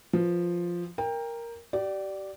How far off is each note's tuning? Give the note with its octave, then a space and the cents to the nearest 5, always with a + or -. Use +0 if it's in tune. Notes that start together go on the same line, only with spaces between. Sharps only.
F3 +0 B4 -5
A#4 +0 G5 +25
G4 -35 D5 +0